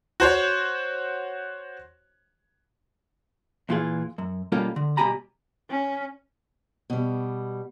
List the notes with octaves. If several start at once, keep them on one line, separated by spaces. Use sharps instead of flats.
F#4 C5 C#5
E2 A#2 E3 F4 G#4
F#2
B2 G3 A#3 C#4 F4 A4
D3
C2 B2 G4 G#5 A#5 B5
C#4
B2 G3